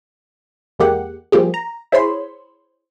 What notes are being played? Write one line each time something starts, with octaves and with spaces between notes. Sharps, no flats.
E2 G#3 A#3 G4 F#5
F3 G3 A#3 F4 G4 G#4
A#5
E4 G#4 C5 C#5 B5 C6